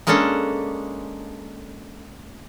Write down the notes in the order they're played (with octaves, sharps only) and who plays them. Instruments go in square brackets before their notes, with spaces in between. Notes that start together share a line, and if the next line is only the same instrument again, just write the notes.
[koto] G#3 A#3 C#4 D4 A4